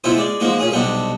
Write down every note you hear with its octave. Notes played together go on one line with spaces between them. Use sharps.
C3 G#3 B3 E4 F4 C5
G#3 D5
F3 G#3 A#3 D#4 F#4
A#2 C#4 G#4
B1 C3 G3 B3 D4 D#4